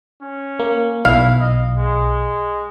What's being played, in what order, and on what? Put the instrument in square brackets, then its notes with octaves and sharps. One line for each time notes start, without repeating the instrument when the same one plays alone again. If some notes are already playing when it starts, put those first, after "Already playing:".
[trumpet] C#4
[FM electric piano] A#3
[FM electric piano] B1 [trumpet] E4 [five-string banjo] F5
[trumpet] D#5
G#3